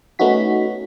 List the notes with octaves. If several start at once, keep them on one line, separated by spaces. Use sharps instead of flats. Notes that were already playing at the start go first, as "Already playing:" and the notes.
A3 B3 C#4 D#4 F#4 B6